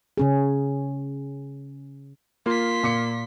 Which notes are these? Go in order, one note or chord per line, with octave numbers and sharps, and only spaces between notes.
C#3 C#4 G#4
A#3 F4 C6 B6
A#2 D6 C#7